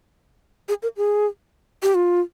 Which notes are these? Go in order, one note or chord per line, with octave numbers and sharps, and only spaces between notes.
G#4
A#4
G#4
G4
F4